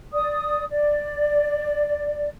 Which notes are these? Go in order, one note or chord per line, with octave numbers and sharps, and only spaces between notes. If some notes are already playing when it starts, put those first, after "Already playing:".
D5 D#6
D5